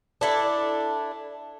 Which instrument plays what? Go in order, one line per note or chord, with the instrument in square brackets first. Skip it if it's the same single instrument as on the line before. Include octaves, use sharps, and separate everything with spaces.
[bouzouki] D4 E4 A4